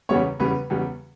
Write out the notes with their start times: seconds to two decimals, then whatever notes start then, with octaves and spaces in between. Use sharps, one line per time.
0.09 E2 C#3 G3 B3 C#5
0.40 E2 C#3 G3 B3 B4
0.70 E2 C#3 G3 B3